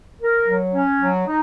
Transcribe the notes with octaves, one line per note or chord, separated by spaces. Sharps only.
A#4
F#3
C#4
F#3
D#4